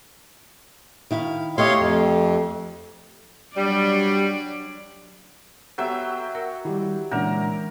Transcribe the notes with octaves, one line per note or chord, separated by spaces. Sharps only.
D#3 E4 F5
A3 G4 C#5 D#5 F5 C6
F2
F#3 G3 D4 D5
F#3 B3 G4 A4 E5 G5
A#4 F#5
D#3 G3 E4 G4
A#2 D3 E3 G#3 C#4 D4 A#4 F#5